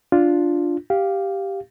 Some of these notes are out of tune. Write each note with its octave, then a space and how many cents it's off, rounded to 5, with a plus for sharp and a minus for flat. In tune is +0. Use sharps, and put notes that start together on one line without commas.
D4 +0 F4 +0
G4 +0 F5 +0